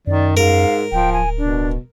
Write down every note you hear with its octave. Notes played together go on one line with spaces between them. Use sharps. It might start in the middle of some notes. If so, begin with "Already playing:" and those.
F#2 D#3 D5
G#2 A#4 F5
D1 F3 G5
G#5
B2 D4